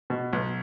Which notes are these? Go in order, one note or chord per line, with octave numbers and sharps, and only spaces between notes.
B2
B1